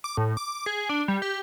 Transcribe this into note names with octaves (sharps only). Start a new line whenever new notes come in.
D6
A2
D6
G#4
D4
G3
G4